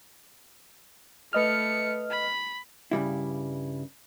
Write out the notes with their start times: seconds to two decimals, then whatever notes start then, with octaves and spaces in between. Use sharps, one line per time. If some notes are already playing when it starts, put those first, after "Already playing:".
1.33 A3 B4 D#5 F6 C#7
2.10 B5
2.91 G2 C#3 G3 E4